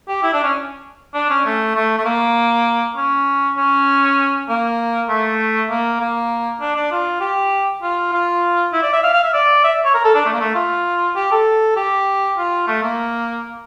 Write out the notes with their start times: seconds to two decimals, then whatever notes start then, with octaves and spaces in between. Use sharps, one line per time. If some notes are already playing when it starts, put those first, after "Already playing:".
0.08 G4
0.23 E4
0.33 D4
0.44 C#4
1.14 D4
1.30 C#4
1.45 A3
1.75 A3
1.98 A3
2.05 A#3
2.96 C#4
3.57 C#4
4.49 A#3
5.09 A3
5.70 A#3
6.00 A#3
6.61 D4
6.76 D4
6.92 F4
7.21 G4
7.83 F4
8.13 F4
8.73 E4
8.83 D5
8.93 E5
9.04 F5
9.14 F5
9.24 E5
9.33 D5
9.64 E5
9.85 C#5
9.94 A#4
10.05 A4
10.15 D4
10.26 A3
10.33 A#3
10.40 A3
10.55 F4
11.15 G4
11.32 A4
11.77 G4
12.38 F4
12.67 A3
12.83 A#3